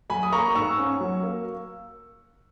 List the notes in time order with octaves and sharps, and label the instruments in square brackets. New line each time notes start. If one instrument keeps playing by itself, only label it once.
[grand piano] F#3 G#5 B5
D#6
A#3 A#5 C#6
G#2 C#6 E6
C#4
F#3
A#3